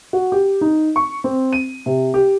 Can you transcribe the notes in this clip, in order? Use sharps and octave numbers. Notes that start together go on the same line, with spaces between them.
F#4
G4
D#4
C#6
C4
D#7
C3
G4